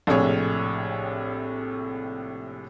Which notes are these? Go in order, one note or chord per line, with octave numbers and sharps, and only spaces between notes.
A#1 A2 C3 G#4 C#5